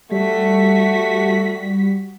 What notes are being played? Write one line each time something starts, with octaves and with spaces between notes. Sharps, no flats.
G3 A3 F#4 B6